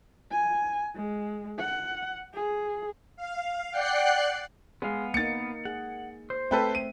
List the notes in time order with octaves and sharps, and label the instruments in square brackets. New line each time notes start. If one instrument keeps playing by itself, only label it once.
[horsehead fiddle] G#5
G#3
F#5
G#4
[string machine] F5
D5 F#5 G5 F#6 C7
[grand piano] G#3 [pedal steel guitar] B3 F5
[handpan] A#3 D#4 [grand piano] A6 C#7
[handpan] G#4 [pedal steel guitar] F#5
[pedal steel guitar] C5
[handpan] A3 C4 E5 [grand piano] A4 B4 G5
[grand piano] D#7